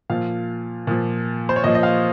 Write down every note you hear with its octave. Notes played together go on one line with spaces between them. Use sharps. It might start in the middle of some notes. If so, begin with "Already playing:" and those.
A#2 F3 F5
A#2 F3
C5
C#5
A#2 F3 D#5
D#5
F5